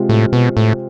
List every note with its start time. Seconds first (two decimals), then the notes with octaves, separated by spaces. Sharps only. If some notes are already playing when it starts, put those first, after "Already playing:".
Already playing: C3 G#3 C4 F4
0.09 A2
0.33 B2
0.57 A2